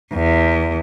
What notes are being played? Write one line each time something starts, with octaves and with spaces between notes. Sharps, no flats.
E2